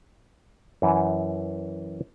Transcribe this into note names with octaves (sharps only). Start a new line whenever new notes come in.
F#2 E3